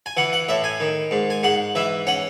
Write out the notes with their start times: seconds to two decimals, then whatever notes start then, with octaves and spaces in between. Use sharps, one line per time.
0.06 G#5
0.17 E3 F#5
0.33 F#5
0.49 A2 E5
0.64 G#5
0.80 D#3
1.11 G#2
1.30 G#5
1.43 G#2 F#5
1.75 E3 E5
2.07 C#4 F#5